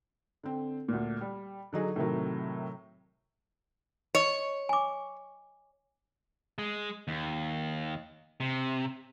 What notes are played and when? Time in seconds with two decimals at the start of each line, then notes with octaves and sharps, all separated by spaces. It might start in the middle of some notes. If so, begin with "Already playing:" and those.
0.43 D3 C4
0.88 D2 A#2
1.21 G3
1.73 D3 F#3 D#4 G#4
1.96 A2 C3 D#3 F#3
4.15 C#5 D#5
4.69 G#5 D6
6.58 G#3
7.08 D#2
8.40 C3